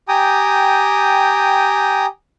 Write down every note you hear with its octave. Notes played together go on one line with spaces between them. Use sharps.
G4 G5 G#5 A#5 D#6